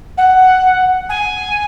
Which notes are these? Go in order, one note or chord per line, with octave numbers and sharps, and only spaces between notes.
F#5
G#5